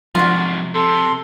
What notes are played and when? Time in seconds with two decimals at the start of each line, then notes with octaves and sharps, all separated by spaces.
0.15 G#2 C3 F3 F4 F#4
0.74 C3 A4 C6